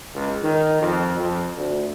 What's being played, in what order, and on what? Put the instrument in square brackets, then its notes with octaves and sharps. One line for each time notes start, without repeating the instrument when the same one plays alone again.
[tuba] C#2
D#3
F2
F2
D2